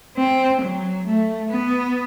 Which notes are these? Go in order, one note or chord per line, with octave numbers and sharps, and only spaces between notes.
C4
F#3
A3
B3